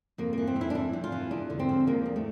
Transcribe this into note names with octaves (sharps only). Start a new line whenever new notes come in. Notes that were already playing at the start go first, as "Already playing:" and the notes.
F2 A#3
E3 A#3
C4
F2 E4
D4
E3 E4
F2
F4
E3
E2 D4
D3
C4
F3
E2 A#3
E2
A3